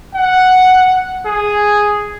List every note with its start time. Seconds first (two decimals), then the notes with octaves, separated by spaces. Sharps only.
0.14 F#5
1.26 G#4